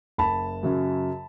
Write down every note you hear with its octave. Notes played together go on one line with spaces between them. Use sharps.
F#1 A5 B5
F#2 C#3 F#3